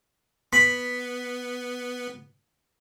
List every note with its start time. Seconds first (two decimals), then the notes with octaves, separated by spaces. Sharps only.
0.53 B3 B5